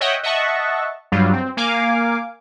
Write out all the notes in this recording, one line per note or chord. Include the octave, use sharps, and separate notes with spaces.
C#5 D#5 E5 F#5 G5
D#5 E5 F#5 A5 C#6
G2 F#3 G3 F4
C4
A#3 F5 G#5 D6